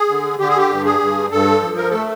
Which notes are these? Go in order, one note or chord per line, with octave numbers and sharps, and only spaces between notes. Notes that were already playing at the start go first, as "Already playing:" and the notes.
Already playing: G#4
D3
D3 G4
G#4
G4
G2
G#4
G2
G2 A4
F3
A#4
A3 A4